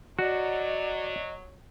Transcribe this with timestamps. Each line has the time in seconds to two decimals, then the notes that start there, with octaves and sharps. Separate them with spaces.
0.19 F#3 F#4 D5 D#5